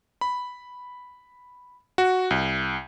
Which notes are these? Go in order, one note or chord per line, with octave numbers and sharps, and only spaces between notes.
B5
F#4
C2